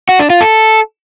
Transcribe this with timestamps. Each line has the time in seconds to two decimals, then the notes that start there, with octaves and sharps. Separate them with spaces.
0.09 F#4
0.19 D4
0.30 F4
0.41 A4